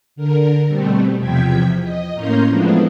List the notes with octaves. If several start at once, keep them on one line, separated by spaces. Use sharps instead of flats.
D3 A#4
B2 G3 A3 C4
E2 C3 F3 G5 G#6 B6
D#5
A2 A#3 C#4 A#5 C6 G6
E3 F3 G#3 A3 B3 D4